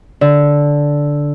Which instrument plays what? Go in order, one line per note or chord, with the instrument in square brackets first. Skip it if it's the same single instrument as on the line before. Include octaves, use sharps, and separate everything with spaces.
[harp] D3